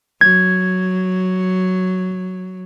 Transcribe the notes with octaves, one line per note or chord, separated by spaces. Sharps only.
F#3 G#6